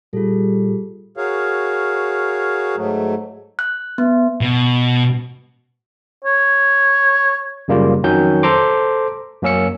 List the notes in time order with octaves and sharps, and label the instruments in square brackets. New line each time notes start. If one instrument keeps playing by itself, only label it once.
[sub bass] A#2 [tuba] G3 [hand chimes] F4 G#4 A4
[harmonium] F#4 G#4 A#4 C#5 F5
G#2 F#3 A3
[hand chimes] F#6
B3
[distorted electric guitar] B2
[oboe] C#5
[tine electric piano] F#2 C#3 G3 A#3 F4
F2 D#3 F#3 C#4 G6
A4 C5 A#5 C6 D6
F#2 A#3 C#4 E6 C#7